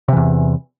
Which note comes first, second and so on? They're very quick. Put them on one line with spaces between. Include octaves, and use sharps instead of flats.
C3 E3 E2